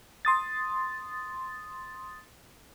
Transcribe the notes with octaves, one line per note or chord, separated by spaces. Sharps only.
C6 D#6 A6